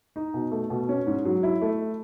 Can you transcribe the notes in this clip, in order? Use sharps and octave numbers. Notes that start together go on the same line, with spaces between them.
D#4
B2
A3
B2
C#4
G#2
F#3
E4
A3